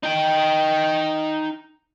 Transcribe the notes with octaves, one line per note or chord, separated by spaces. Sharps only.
D#4 G5